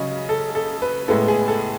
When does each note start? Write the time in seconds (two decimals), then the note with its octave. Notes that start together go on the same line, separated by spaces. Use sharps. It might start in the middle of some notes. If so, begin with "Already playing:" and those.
Already playing: C#3 F#3 C#4 D#5
0.29 A4
0.55 A4
0.82 B4
1.08 A2 G#3 B3 E4 A4
1.28 G#4
1.48 A4